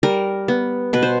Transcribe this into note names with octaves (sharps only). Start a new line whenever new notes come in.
G3 A#4
B3
B2 B4
C5